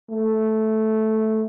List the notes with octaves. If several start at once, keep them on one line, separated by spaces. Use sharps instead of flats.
A3